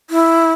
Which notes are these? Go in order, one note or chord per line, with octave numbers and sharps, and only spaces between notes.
E4